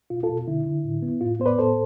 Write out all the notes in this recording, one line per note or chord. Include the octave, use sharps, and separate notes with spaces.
B2 F4
F4 A4
B2
D3 E4
D3
A2
B3
A2 F4
B3 C5
B4 D5
A2 A4 C5